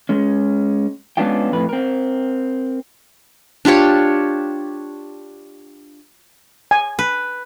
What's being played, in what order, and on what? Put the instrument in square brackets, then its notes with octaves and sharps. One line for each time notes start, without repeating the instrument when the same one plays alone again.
[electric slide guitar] G#3 C#4
G#3 B3 C#4 D4 F4 G5
F2 A2 B4
C4 A#4
[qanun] D4 F4 G4 C#5
[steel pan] G#5
[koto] B4